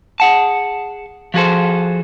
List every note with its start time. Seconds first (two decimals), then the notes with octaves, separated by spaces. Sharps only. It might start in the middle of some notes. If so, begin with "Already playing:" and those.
0.20 G#4 F#5 A5
1.34 F3 F#4 G#4 A4 C5